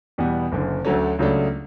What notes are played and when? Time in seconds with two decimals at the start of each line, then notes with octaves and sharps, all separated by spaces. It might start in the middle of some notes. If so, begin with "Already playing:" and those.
0.18 E2 B2 G3 B3
0.52 F#1 F#2 D3
0.85 D2 D3 F#3 A3 C#4
1.19 C#2 C#3 F#3 A3 D4